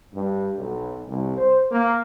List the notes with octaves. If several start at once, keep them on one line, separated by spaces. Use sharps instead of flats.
G2
B1
C2
C5
A#3